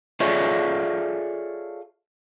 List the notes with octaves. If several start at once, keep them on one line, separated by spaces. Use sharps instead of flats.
F4 G#4 A4 C#5 D5 E5